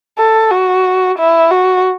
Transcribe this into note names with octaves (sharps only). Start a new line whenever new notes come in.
A4
F#4
E4
F#4